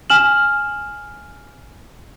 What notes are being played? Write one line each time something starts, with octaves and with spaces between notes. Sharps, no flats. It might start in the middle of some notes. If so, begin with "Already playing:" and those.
G#5 F6 E7 F#7